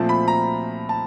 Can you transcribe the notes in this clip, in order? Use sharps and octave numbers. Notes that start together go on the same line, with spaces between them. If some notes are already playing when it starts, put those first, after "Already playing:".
Already playing: A#2 F3 A3 C4 A5
B5
A#5
A5